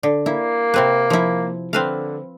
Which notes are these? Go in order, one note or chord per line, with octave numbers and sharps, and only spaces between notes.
D3
A#3 E4
C3 C4 B4
F3 E4
D3 C4 B4 F5